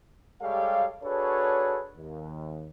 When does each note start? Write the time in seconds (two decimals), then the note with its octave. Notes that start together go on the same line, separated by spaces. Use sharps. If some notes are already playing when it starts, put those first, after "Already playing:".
0.42 G3 G#3 G4 A4 C#5 F5
1.04 D4 F#4 G#4 A4 B4 C#5
1.97 D#2